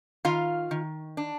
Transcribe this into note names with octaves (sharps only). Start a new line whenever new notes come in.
D#3 F4 F5
D#3
D4